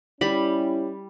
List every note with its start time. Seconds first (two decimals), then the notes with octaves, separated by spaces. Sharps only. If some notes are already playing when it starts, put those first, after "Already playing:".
0.21 G3 C#4 E4 G4 B5